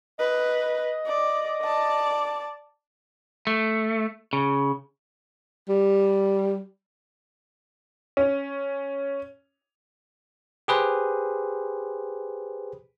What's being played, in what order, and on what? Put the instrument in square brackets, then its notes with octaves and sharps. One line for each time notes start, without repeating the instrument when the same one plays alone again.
[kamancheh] B4 [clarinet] D#5
[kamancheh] D5
D5 A5
[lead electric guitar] A3
C#3
[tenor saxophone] G3
[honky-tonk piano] C#4
[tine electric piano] G4 G#4 B4 C5